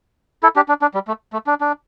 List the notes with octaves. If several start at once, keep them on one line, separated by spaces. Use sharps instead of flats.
E4 A4
D4 G4
D4
D4
G3
A3
A3
D4
D4